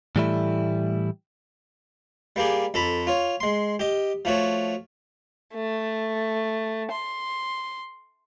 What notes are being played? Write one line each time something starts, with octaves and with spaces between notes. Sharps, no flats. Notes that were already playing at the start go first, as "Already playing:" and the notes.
A2 E3 G3 A3 E4
G3 A#3 G4 G#4
F2 A4 A#5 B5
F4 C#5
G#3 C6
G4 D#5
F3 A3 F#4 C#5
A3
C6